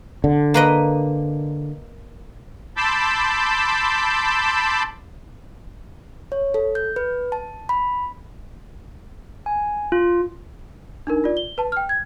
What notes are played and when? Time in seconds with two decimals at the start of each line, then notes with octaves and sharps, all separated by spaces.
0.24 D3
0.54 A#3 B4 D#5
2.77 A5 B5 C6 D6 E6 G6
6.32 C#5
6.54 A4
6.75 G6
6.96 B4
7.32 A5
7.69 B5
9.46 G#5
9.92 F4
11.07 D4 D#4 A#4
11.24 F4 D5
11.37 G7
11.58 B4 A5
11.72 G5 F6
11.89 G#6